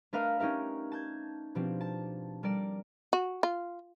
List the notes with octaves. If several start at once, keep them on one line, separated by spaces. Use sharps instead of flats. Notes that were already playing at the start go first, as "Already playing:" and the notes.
A3 D4 A#4 B4 D#5 F5
C#4 D#4 G4 A#4 E5
A5 G6 G#6
B2 F3 C4 D4 G4
A5
G3 A4 A#4 D5
F#4
F4